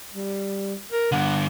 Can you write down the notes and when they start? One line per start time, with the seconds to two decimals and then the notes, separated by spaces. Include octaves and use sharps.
0.14 G3
0.92 A#4
1.12 G2 D3 F#5